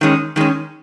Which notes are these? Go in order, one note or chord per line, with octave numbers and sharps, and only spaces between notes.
D#3 G#3 C#4
D#3 G#3 C#4